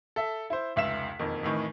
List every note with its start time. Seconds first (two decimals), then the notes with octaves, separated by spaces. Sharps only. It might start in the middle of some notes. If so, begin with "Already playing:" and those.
0.16 A4 E5
0.50 E4 C5
0.76 F1 C#2 E5 F5 B6 E7
1.19 E1 F2 D#3 A#3
1.43 F2 A2 D#3 E3